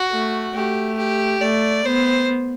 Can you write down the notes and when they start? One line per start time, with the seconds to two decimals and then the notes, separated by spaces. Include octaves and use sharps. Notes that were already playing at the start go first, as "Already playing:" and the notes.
Already playing: F#4
0.11 A3
0.54 A3 G4
0.98 G4
1.41 A3 D5
1.85 B3 C5